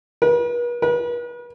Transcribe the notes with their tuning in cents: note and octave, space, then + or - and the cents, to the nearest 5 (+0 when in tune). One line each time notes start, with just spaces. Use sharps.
B4 -45
B4 -40